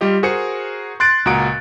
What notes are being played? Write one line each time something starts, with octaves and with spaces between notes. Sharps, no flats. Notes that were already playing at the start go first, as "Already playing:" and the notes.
G3 F4 G4 D#5
F#4 G#4 A#4 C5 C#7
C6 F#6 A6 D7
C#2 A#2 F#4 A#5 D#6 D7